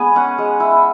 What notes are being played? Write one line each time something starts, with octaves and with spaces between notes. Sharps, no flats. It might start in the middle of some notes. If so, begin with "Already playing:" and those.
Already playing: G#3 B3 G#5 B5
C#4 F#5
G#3
E4